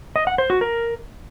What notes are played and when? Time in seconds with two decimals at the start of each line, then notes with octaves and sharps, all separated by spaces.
0.16 D#5
0.27 F#5
0.38 C5
0.50 F#4
0.61 A#4